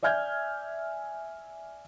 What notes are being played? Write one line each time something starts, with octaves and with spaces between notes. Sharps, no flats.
D5 E5 G#5 F6 G6 G#6